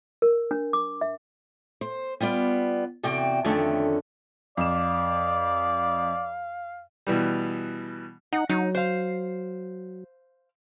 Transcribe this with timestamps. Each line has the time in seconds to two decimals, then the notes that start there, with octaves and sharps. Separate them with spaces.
0.22 A#4
0.51 D4
0.73 D6
1.01 E5
1.81 C5
2.20 G3 B3 F4 D5
3.03 E2 C3 F#4 D5 G5
3.45 F2 D3 D#3 A3 C#4 D4
4.57 F2 D5 F5 E7
7.07 B2 E3 G3
8.33 D#4 F#5
8.49 F#3 D#4
8.75 C5 F5